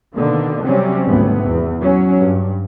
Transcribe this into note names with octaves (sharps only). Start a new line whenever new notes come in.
B2 D3 D#3 A#3
C3 F#3 G3 C4 C#4
G#1 D2 C3 B3
E2
F#3 C#4
G2